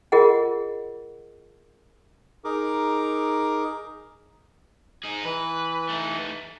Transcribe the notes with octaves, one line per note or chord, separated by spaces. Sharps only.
F4 G#4 A#4 D#5 F#5
D#4 G#4 A#4 D6
D#4 G#4
E3 B4
A3 D#4